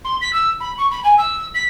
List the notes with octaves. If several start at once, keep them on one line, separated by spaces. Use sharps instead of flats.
C6
B6
E6
B5
C#6
B5
G#5
E6
B6